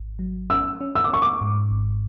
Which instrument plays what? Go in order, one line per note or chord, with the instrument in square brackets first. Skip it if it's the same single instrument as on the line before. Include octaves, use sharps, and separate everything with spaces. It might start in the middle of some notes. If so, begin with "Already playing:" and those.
Already playing: [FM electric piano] G#1
F#3
[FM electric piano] C#4 [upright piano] E6
[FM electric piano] C#4
[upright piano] E6
D6
[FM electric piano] C#4 [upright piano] C#6
[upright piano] D6
[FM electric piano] G#2
G#1